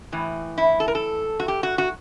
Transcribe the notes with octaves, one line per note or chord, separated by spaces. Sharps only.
A2 E3
E4
A4
A#4
A4
F#4
G4
F#4
F#4